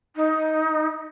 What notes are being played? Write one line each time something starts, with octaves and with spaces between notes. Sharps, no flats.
D#4